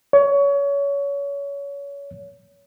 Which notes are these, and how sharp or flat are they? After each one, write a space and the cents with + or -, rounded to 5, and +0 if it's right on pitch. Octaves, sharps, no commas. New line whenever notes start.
C#5 +25